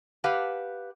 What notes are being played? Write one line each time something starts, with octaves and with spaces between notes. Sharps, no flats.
G4 B4 F5 F#5 A5